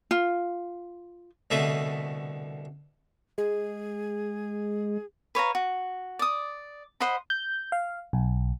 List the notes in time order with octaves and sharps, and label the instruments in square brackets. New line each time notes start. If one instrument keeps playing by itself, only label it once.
[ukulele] F4
[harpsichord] C2 B2 D3 A3 B4 E5
[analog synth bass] G#3 [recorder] G#4
[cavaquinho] B4 C#5 F5 A#5
F#4
D5 D#6
C5 D#5 F#5 B5
[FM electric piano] G6
F5
B1